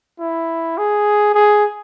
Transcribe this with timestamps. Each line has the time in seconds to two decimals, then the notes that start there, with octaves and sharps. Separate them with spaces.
0.19 E4
0.78 G#4
1.34 G#4